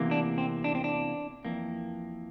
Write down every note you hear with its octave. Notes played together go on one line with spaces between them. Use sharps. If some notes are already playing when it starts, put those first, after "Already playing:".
Already playing: E2 C3 E3 A#3
D4
C4
D4
C4
D4
F2 E3 A#3